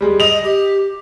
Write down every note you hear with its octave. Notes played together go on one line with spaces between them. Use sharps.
G3 G#3
D#5 F7
G4